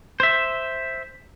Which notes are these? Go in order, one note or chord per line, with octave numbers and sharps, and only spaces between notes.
C5 E5